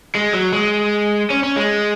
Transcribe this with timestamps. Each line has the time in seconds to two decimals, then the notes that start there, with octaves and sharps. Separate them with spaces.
0.15 G#3
0.33 F#3
0.52 G#3
1.30 C#4
1.43 C#4
1.56 G#3